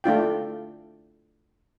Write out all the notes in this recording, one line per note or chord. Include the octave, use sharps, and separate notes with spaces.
A3 D4 F4 G5